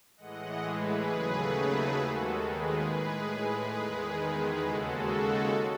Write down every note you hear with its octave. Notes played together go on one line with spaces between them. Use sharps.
A2 E3 G#3 D#5 F#5
G#4 B4
D#2 C#3 F#3 A3
D#2 D#3 G#3 F#4 A4
G#4 B4
A2 G#3
E2 D#3 G#3
D#2 C#3 G#3 F#4 A4